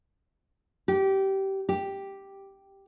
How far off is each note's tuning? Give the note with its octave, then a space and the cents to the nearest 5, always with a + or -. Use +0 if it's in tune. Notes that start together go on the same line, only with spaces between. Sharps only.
G4 -20
G4 +0